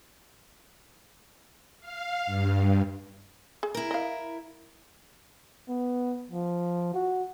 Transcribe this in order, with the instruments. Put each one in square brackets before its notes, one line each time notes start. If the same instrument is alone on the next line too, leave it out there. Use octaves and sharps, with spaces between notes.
[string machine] F5
G2
[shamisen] G#4
[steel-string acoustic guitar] E4 A#4
[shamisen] D#5 F5
[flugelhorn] B3
F3
F#4